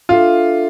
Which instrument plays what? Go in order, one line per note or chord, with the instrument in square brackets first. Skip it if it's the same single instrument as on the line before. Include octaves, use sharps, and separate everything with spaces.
[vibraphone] D4 A4 E5 [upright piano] F4